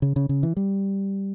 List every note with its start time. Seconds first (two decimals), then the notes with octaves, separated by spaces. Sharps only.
0.02 C#3
0.16 C#3
0.29 C#3
0.43 E3
0.57 G3